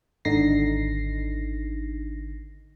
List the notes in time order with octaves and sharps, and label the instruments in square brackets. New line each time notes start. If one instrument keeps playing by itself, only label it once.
[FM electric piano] G#1 D3 D#4 A#6 C7